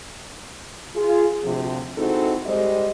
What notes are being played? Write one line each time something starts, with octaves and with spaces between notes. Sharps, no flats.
F4 G#4
D2 C3 F3
G#3 C4 D#4 E4 F#4 A4
G3 G#3 G4 C5 D#5